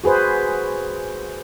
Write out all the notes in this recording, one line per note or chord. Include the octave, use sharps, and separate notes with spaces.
F#4 G#4 B4 C5